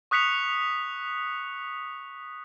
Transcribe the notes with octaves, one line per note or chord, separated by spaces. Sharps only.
C#6 D#6 F#6 B6 C#7 F7